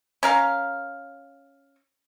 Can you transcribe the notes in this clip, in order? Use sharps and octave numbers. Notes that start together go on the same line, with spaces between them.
C#4 A#4 F5